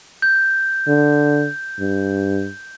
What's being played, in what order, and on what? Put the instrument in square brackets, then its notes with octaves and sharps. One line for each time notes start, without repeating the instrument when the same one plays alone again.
[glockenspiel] G6
[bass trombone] D3
G2